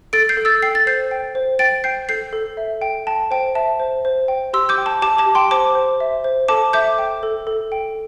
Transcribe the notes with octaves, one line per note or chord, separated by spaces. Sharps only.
A4 A6 D7
G6 C7
A4
E6 A6
G5 C7
A6
C5 G6 C7
G5
C5
G5 A6 D7
G5 G6 C7
A4 G6 C7
A4
E5
G5
G5 A5
C5 G5
E5 A5
C5
C5
G5
G4 C6 E6
D6 G6
G5
A5 D6
G4 A5 D6
A5 D6
G4
G5 C6
C5 A5 D6
C5
E5
C5
A4 A5 D6
E5 D6 G6
G5
A4
A4
G5